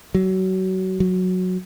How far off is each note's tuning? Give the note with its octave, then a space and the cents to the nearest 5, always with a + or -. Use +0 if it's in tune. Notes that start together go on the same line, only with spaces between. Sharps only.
F#3 +25
F#3 -10